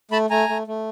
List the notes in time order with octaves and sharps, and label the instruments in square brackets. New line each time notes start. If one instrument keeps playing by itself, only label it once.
[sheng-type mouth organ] A3 A5 B5
A3 G#5 A#5
A3
A3